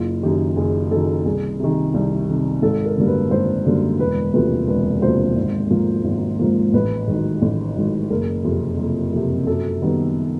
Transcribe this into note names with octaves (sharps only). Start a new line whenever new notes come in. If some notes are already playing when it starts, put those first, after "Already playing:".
Already playing: F#1 F4
F#2 D#3 G4
F#1 G#4
F#2 D#3 A4
C2 G#4
C3 D#3
C2
C3 D#3
G#1 A4
A#4
F#2 D3 G3 A#3
B4
G#1 C5
F#2 D3 G3 A#3
E1 B4
D2 C3 F3 A#3 B4
E1 B4
D2 C3 F3 A#3 C5
G#1
G#2 F3 A#3
G#1
G#2 F3 A#3
A1 B4
G#2 D#3 F#3
A1
G#2 D#3 F#3
F#1 A#4
F2 C3
F#1
F2 C3
F#2 A4
D#3 G3 B3